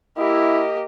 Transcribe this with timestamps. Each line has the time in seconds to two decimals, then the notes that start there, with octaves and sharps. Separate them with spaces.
0.18 A#3 E4 G4 D#5